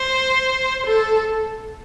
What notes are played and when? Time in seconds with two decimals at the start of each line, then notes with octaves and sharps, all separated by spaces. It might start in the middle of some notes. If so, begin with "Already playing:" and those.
Already playing: C5
0.86 A4